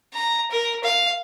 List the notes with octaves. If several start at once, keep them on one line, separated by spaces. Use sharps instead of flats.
A#5
A#4
F5